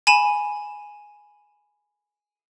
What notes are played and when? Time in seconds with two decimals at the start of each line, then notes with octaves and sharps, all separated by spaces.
0.07 G#5 B5 D#7 E7